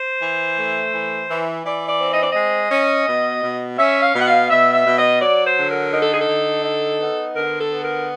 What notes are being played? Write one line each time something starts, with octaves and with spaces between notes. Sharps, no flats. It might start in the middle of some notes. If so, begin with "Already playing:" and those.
Already playing: C5
E3
A3
E3
E3
E3 D5
D5
C4
D#5
D5
G#3 D#5
C#4
B2
B2
C#4 E5
F5
B2
F#5
F5
B2 E5
E5
B2
D#5
F#3 D5
C5
D3
A#4
D#4 A#4
A4
G#4
A4
D3
D#4
B3
D3 A#4
A4
B3
A#4